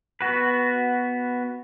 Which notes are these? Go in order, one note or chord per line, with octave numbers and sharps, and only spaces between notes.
B3 F#4 B4